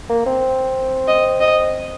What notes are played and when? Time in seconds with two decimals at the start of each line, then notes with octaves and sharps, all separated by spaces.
0.09 A#3
0.26 C4
1.08 D#5
1.41 D#5